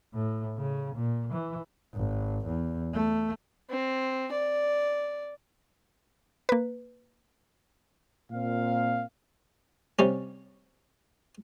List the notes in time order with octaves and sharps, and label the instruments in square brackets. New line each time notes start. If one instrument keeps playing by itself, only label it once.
[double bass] A2
C#3
A#2
E3
G#1
E2
A3
[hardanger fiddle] C4
D5
[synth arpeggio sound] A#3 B4
[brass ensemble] A#2 C4 F5
[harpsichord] C3 G3 C#4